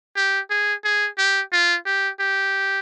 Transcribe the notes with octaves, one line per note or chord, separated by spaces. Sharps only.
G4
G#4
G#4
G4
F4
G4
G4